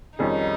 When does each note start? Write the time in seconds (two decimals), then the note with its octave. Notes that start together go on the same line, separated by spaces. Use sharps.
0.19 F2 D#3 G3 C#4 D#4 G#4